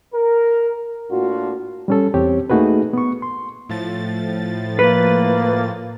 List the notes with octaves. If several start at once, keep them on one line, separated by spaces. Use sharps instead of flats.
A#4
A2 A#3 D4 F4 F#4
G3 C#4 A4
E2 C4 G4 C#5
A3 A#3 D#4 F#4 G#4 B4
B3 C#6
C6
A2 F3 A6
A#3 B4